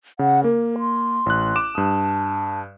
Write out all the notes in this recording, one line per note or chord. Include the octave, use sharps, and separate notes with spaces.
C#3 F#5
A#3 A#4
C6
A1 F#6
D6 E7
G2 A5 D#6